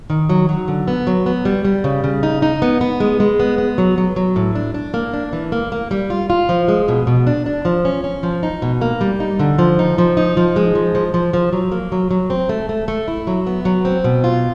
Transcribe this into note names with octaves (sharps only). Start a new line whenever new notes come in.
D#3
F#3
F#3
D3
B3
F#3
B3
G3
G3
C#3
C#3
D#4
D#4
B3
B3
G#3
G#3
B3
B3
F#3
F#3
F#3
A2
D4
D4
A#3
D4
E3
A#3
A#3
G3
F4
F4
F3
G#3
B2
B2
D4
D4
F3
C#4
C#4
F3
D#4
B2
A#3
G3
D#4
D3
F3
D#4
F3
D#4
F3
G#3
F3
F3
F3
F3
F#3
A#3
F#3
F#3
C4
A3
A3
A3
E4
F#3
B3
F#3
C4
B2
F4